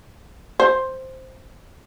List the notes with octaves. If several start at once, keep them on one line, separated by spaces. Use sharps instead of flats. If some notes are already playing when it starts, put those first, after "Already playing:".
C5